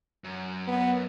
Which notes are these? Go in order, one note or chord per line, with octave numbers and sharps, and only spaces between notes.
F#2
B3